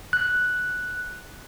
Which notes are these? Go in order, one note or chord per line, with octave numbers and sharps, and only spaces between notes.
F#6